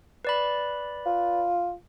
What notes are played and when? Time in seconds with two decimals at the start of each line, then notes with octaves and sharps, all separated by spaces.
0.25 B4 D5 B5
1.06 F4